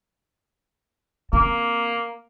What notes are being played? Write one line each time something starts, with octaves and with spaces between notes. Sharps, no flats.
A#3 C4